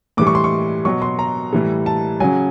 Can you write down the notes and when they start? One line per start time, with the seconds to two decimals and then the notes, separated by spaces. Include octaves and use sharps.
0.17 A2 E3 G3 D6
0.27 C#6
0.35 C6
0.44 C#6
0.85 B2 F#3 C#6
1.02 C6
1.19 A#5
1.53 A2 E3 G3
1.86 A5
2.20 C#3 F#3 G#5